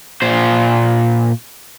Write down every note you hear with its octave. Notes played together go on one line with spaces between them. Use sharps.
A#2 C5